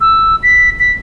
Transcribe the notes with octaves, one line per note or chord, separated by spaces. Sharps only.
E6
B6
B6